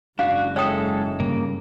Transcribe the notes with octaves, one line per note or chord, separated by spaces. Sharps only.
F#1 G#2 D4 F#4 F5
G#3 A4 C#5 E5 G5 D#6
G2 C#3 A#3